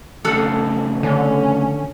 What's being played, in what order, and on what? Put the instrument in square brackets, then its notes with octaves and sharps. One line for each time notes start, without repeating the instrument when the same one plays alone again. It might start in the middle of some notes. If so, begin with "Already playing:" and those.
[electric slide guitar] F2 C#3 A3 [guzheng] A4 F5 F#5
[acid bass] D3 [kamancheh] C#4